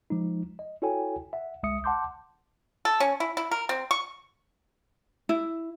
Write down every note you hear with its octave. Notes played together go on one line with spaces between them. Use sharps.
F3 G#3 D#4
D#5
E4 F#4 A4 C#5 G5 G#5
E5 F#5
G1 C2 G#3 E5 D#6 C#7
F#5 A5 C6 D6 G6
A4
C#4
E4
E4
A#4
C4
C#6
E4